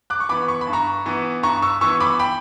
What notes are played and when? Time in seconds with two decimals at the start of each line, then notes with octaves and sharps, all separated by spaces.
0.10 D6 F#6
0.20 C#6
0.29 E3 B3 B5 D6
0.48 C#6
0.61 B5
0.67 G2
0.73 A#5 C#6
1.06 E3 B3
1.43 G2 A#5 C#6
1.62 C#6 E6
1.81 E3 B3 C#6 E6
2.00 B5 D6
2.19 G5 B5